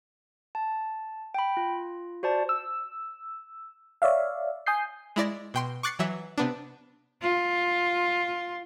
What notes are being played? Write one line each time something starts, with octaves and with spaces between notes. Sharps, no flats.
A5
G5 B5
F4
F#4 C5 D5 A5
E6
C#5 D5 E5 F5
G#5 D#6 G6 C7
G#3 E4 D5 A#6
B2 G5 C6
C#6 D6 F#6 A6 C7 C#7
E3 F#3 E5
C3 B3 D4
F4